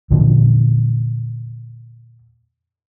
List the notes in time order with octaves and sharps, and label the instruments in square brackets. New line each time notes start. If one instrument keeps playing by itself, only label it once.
[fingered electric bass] E2 A#2 D3 F3